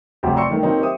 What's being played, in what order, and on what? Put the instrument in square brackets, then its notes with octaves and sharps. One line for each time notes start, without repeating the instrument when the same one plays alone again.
[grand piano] F1 C3 F#3 C4 F#4 G4
D5 A#5 C6 C#6 E6 C#7
D#3 A3 A#3
D#3 F#3 A#3 C4 D#4
G4 C5 E5 D#6